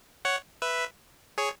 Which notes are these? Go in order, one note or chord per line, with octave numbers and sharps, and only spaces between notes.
C#5 F#5
B4 E5
G#4 C#5